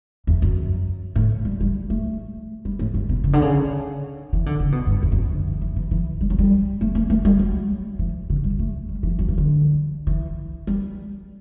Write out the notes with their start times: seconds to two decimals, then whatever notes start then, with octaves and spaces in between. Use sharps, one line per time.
0.27 E2
0.42 F#2
1.16 A2
1.45 G3
1.61 G3
1.90 A3
2.65 G3
2.79 A2
2.94 G2
3.09 B2
3.24 C#3
3.33 D3
3.42 C#3
4.33 E3
4.46 D3
4.60 C#3
4.72 B2
4.87 G2
5.03 E2
5.12 F#2
5.23 E3
5.33 D3
5.47 E3
5.62 E3
5.76 E3
5.91 E3
6.21 G3
6.30 F#3
6.39 G3
6.81 A3
6.95 A3
7.10 A3
7.25 G3
7.39 F#3
7.99 E3
8.30 C#3
8.44 G3
8.59 A3
8.89 G3
9.03 E3
9.19 F#3
9.29 E3
9.38 D3
10.07 E3
10.67 G3